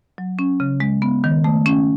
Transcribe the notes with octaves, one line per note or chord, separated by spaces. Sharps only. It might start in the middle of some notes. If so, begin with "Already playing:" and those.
F#3
C#4
C#3
G#3
B3
D#3
A3
C#4